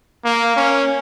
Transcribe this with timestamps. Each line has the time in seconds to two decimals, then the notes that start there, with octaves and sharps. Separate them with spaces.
0.24 A#3
0.56 C#4